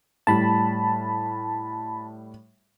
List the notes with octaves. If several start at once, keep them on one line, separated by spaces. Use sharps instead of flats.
A2 G3 A5 B5